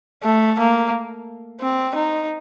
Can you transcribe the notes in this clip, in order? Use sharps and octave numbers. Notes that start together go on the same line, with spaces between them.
A3
A#3
C4
D#4